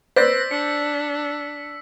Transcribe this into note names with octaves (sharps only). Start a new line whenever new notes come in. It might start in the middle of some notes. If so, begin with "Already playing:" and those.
B4 C5 D5 E6 F#6 A#6 B6
D4 C#7